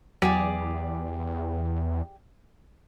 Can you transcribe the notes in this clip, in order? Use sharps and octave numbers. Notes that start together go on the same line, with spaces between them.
E2 F#3 G4 G#4 D5